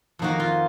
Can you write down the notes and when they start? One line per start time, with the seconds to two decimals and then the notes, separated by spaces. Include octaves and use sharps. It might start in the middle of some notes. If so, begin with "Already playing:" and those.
0.19 F2 D#3 A#3 D#4 F#4
0.40 F4